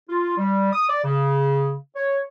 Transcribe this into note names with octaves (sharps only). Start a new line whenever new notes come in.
F4
G3
D#6
D5
C#3
C#5